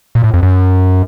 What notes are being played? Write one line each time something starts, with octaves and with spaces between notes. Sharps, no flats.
A#2
A2
F2
F#2